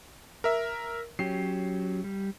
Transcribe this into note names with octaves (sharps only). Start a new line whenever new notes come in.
A#4 E5
F#3 C#4 G4 C7
G3